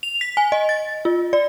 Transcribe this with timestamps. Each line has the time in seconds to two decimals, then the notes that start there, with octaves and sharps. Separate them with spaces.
0.03 F7
0.21 B6
0.37 G#5
0.52 D#5
0.69 A6
1.05 F4
1.33 D5